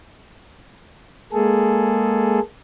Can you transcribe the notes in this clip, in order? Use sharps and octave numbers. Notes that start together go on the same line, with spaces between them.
G#3 A#3 G#4 A4